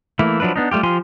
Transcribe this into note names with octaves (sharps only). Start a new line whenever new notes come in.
E3 A3 A#3 E4
F3 F#3 D4 E4 B4
B3 D4 D#4
G3 A3 F4 G4
F3 F4 G4 G#5 C6